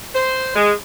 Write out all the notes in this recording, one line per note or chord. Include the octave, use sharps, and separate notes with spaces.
C5
G#3